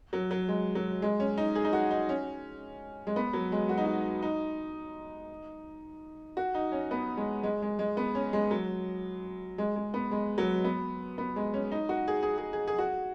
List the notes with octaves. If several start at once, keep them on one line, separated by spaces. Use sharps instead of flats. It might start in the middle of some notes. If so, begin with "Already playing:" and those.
F#3
F#3
G#3
F#3
G#3
C#4
D#4
G#4
D#4
F#4
D#4
C#4
G#3
B3
F#3
G#3
F#4
D#4
F#4
D#4
F#4
D#4
C#4
B3
G#3
G#3
G#3
G#3
B3
C#4
G#3
F#3
G#3
G#3
B3
G#3
F#3
B3
B3
G#3
C#4
D#4
F#4
G#4
G#4
G#4
G#4
G#4
F#4